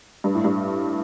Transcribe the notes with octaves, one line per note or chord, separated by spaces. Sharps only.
G2
A2
G2